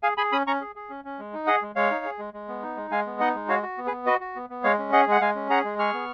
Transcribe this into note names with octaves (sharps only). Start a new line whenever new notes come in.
G#4 F5 G#5
G#4 G#5 B5
C#4 B5 D#6
C#4 A#5 C#6
G#4
G#4
C#4
C#4
G#3
D#4
G#4 D#5 F#5
G#3
G#3 C#5 F5
D#4
G#4
G#3
G#3
B3
D#4
G#3
G#3 F5 G#5
B3
D#4 D#5 F#5
G#3
F#4 C#5 F5
F#4
B3
G#4 B4
B3
F#4 B4 D#5
F#4
B3
B3
G#3 C#5 F5
C#4
G#4 D#5 F#5
G#3 F#5
G#3 F5 G#5
C#4
G#4 F#5 A#5
G#3
G#4 C#6 F6
B3